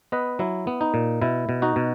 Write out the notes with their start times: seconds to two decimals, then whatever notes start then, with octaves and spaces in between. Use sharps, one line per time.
0.12 B3 B4 D#5
0.39 F#3 E4
0.67 B3
0.81 D#4
0.94 A#2
1.21 B2 E4
1.49 B2
1.62 D#4 F#4
1.76 B2